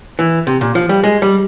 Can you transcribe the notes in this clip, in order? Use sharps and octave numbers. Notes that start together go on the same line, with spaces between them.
E3
C3
A#2
F3
G3
G#3
G3